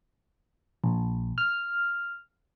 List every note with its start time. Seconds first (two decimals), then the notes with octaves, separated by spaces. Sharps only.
0.84 A#1
1.38 F6